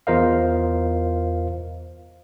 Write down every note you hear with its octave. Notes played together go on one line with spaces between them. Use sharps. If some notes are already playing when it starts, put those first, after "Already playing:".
E2 F4 A#4 C5 D#5 F5